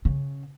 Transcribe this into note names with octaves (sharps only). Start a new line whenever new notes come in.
C#3